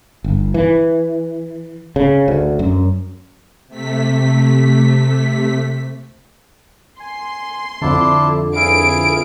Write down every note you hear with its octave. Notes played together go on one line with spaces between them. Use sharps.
G1
E3
C#3
D2
F#2
C3 A3 B6
G#5 C6
F2 D3 D4 E4 A5
E4 G#4 F5 D7